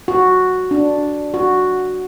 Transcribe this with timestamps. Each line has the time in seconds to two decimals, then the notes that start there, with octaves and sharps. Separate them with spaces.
0.08 F#4
0.71 D4
1.34 F#4